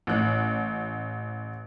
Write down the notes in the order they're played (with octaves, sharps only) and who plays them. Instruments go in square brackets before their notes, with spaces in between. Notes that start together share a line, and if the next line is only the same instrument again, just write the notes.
[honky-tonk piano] A1 F#6